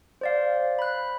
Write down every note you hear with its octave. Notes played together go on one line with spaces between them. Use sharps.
C5 D5 F5
B5 F#6